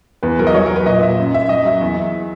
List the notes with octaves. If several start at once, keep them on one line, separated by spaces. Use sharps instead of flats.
E2 B4
F#3 A#4
D#5
F#3 C#5
A#4
F#3 B4
A#2 D#5
A#2 E5
F#2
F#2 E5
F#2 D#5
F#3 E5
E2
E2